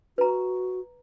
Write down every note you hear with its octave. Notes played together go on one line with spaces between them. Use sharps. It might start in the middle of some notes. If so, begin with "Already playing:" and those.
F#4 B4 A#5